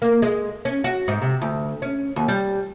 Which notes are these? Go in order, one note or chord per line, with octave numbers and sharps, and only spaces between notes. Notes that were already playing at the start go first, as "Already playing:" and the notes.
A#3
G#3
C#4
F#4
G#2
C3
D2
C#4
D#2
G3